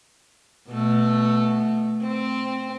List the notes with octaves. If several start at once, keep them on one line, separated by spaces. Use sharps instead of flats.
B2 A3
C4